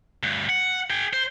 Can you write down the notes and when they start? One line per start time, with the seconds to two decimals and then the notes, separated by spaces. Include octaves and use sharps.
0.23 D2 G2
0.49 F#5
0.90 G#4 G5
1.13 C5